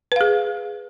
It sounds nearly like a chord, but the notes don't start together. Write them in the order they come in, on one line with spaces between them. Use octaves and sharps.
B4 F5 G#4